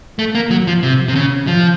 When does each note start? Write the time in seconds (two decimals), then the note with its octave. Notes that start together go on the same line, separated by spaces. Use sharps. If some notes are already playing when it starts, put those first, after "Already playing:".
0.19 A3
0.35 A#3
0.51 F#3
0.67 F3
0.83 C3
1.08 C3
1.16 C#3
1.47 F3